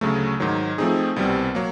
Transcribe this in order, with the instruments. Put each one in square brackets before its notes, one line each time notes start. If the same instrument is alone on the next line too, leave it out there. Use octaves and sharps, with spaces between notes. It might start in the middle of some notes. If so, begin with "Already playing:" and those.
[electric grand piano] D2 C#3 F#3 A3
G#2 D#3 F#3
F3 A3 C4 D#4 G#4
C2 B2 G3 C4
F#3 A#3